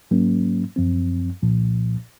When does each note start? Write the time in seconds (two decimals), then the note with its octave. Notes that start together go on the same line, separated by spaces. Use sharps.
0.11 G#2 F#3 A#3 C#4
0.76 F#2 F3 C4
1.42 C2 A#2 F3